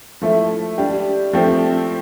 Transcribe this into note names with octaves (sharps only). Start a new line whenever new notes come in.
F3 A3 E4
G3 D4 G4
F3 A3 C4 G4